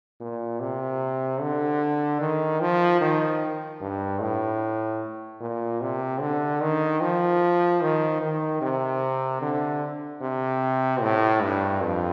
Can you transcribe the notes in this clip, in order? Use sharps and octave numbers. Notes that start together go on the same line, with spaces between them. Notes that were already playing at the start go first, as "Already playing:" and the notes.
A#2
C3
D3
D#3
F3
D#3
G2
A2
A#2
C3
D3
D#3
F3
D#3
D#3
C3
D3
C3
A2
G2
F2